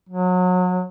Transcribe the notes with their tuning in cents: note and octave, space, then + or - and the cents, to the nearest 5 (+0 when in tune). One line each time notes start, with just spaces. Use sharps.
F#3 -30